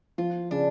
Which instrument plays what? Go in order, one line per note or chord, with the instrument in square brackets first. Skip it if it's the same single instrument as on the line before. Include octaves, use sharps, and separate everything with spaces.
[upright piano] F3 [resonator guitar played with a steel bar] F4
[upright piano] C#3 [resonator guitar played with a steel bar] D4